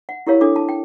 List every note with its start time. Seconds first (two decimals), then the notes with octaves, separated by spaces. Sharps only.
0.09 F#5
0.27 E4 G4 A#4 C#5 F5
0.41 D4 A4 D6
0.56 A5
0.69 G5